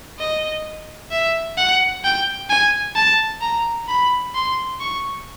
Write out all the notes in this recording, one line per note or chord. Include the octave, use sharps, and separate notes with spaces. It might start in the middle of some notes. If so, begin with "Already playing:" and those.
D#5
E5
F#5
G5
G#5
A5
A#5
B5
C6
C#6